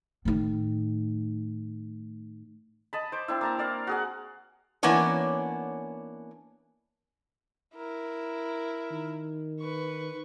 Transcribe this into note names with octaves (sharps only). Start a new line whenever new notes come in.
A2 D#3
D#5 A5 B5
C5 D6
C4 D4 E4
A#3 A5 A#5
A#4 D5 F5
F#4 G#4 F#5
E3 A#3 B3 C#4 D4 C#5
E4 A#4
D#3
B4 C#6